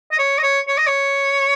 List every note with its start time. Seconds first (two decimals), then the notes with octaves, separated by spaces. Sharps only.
0.12 D#5
0.18 C#5
0.38 D#5
0.43 C#5
0.68 C#5
0.78 D#5
0.87 C#5